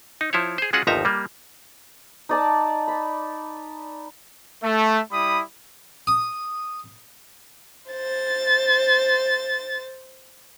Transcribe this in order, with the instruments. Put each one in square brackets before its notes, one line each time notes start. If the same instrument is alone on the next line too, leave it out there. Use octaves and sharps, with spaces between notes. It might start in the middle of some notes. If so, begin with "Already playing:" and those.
[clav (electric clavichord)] D#4
F3 E4 C5 C#5
G#4 C5
G#3 C#4 F4 F#4 G#4 F#5
G1 D#2 F3 D#4 E5 A#5
G3 A#3
[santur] D#4 D5 A5
B5
[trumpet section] A3
G3 E4 B5 D#6
[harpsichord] D#6
[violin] C5 A6